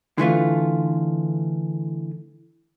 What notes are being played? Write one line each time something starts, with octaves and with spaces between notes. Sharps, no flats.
D3 E3 A3 F4